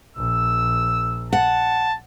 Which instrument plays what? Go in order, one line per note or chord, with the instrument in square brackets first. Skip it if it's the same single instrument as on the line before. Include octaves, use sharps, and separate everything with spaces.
[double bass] A#1 [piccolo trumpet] E6
[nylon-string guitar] F#5 [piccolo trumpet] A5